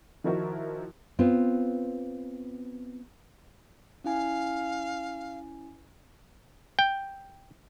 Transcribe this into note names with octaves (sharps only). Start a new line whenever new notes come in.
D#3 F3 D#4 E4 F#4 A#4
B3 C4 F4
C#4 E4 F5 G#5
G5